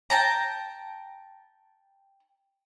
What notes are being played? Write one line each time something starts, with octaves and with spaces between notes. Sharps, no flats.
G5 A5 A#5